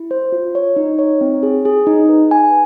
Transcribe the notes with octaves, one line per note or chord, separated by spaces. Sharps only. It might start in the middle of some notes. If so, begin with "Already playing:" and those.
Already playing: E4
C5
F4
C#5
D#4
C#5
C4
G#4
G#4
D#4
B4
G#5